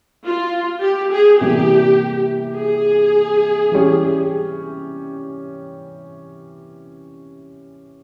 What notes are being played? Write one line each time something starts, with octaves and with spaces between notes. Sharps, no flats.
F4
G4
G#4
C3 E3 G3 A#3 G4
G#4
E3 G3 C#4 G4